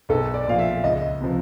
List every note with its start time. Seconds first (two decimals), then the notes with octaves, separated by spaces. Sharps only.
0.09 B1 A4
0.34 D5
0.47 A#2 F3 F5
0.59 E5
0.84 C#2 D#5
1.21 C3 F3